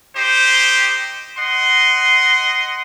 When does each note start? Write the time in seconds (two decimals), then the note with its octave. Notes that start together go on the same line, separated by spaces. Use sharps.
0.15 D#4 G4 C5
1.38 D#5 F#5 C6